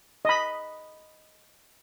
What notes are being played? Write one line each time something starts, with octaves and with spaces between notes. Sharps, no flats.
D#5 B5